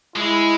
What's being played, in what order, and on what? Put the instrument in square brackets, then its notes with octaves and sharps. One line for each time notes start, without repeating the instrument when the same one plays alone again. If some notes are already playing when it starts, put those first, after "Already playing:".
[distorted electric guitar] G#3 [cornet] E4